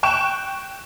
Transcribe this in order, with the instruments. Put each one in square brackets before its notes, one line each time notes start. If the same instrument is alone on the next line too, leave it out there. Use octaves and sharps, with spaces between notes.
[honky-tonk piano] G5 C#6 F#6 E7